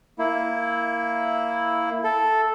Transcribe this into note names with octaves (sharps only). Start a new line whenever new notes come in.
A#3 E4
A4